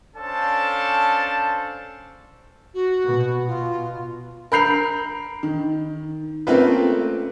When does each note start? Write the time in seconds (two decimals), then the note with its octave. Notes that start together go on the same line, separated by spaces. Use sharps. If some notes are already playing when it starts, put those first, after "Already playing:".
0.16 C#4 D4 A4 C5 F5 A5
2.74 F#4
3.04 B2
3.47 F4
4.52 A#4 B5 G6 C7 F7
5.43 D#3
6.47 A3 A#3 C4 C#4 F4 B4